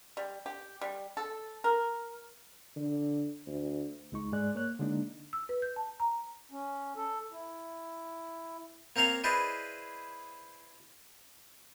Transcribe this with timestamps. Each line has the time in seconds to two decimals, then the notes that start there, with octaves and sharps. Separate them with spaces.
0.17 G3
0.46 G4
0.81 G3
1.17 A4
1.64 A#4
2.76 D3
3.47 D2
4.12 C#2 G#3 D#4 C#6
4.32 G#2 G#3 D5 F#6
4.55 A#3 C#5 F#6
4.79 D3 G#3 A#3 D4 D#4
5.33 E6
5.49 B4
5.62 G6
5.76 A5
6.00 A#5
6.51 C#4
6.97 A4
7.32 E4
8.96 A#3 C4 A#4 C#5 F5
9.24 E4 G#4 B4 C5 D5 D#5